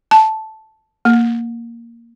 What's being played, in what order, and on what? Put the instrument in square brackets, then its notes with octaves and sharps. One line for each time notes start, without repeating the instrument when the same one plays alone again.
[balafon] A5
A#3